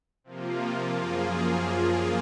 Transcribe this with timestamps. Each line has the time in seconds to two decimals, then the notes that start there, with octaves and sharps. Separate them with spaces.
0.24 C3 F3 A#3 F4
0.98 F#2 F3 A#3 F4 G#4